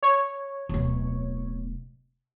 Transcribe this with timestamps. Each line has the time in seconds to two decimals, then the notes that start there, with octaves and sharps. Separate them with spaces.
0.03 C#5
0.69 D1 B2